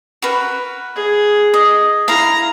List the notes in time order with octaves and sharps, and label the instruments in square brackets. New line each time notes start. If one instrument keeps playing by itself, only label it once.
[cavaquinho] F#4 A#4 B4
[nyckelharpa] G#4
[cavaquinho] D#5
[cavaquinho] E4 F5 [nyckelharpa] A#5